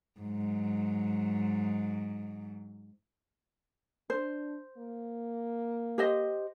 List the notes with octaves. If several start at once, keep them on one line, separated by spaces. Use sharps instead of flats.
G#2 F#3
D4 C5
A#3
G4 C5 D#5